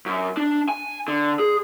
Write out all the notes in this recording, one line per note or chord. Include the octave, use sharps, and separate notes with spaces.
F#2
D4
G#5
D3
G#4